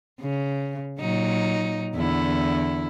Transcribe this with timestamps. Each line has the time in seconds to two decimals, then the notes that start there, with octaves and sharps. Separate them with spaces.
0.21 C#3
0.99 A#2 F#3 D#4
1.95 E2 D3 E4